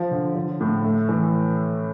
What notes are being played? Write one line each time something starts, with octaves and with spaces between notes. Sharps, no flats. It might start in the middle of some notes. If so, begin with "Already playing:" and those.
Already playing: F3
D3
F3
A2
A3
E3